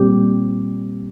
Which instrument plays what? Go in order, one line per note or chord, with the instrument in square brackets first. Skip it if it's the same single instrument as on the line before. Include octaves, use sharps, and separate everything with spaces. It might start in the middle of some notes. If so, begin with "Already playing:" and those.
Already playing: [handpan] A#2 G3 C4 G4